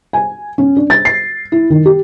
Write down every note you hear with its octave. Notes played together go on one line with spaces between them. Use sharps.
G#5
C#4
D4
A6
C7
E4
D#3
G4